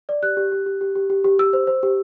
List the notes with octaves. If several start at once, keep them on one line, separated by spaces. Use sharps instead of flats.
D5
G4 F#6
G4
G4
G4
G4
G4
G4
G4
G4 E6
C5
C5
G4